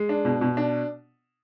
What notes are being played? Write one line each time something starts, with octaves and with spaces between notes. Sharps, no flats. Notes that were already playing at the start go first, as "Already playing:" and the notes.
Already playing: G#3
D4
B2
B2
D4